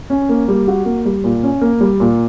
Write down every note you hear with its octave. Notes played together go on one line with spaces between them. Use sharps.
C#4
A#3
G3
F#4
A#3
G3
A#2
C#4
A#3
G3
A#2